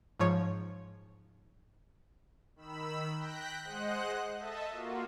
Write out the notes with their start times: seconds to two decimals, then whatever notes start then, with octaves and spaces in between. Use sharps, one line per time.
0.19 G#2 F3 C#5
2.56 D#3 B5 E6
3.17 G5 F#6 G6 A#6 B6
3.64 G#3 C5 D#5 F#5 F#6
4.37 A4 D#5 E5 A5
4.68 A#3 F4 F#4